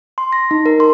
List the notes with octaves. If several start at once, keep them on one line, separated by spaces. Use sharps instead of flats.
C6
A#6
D#4
A#4
C6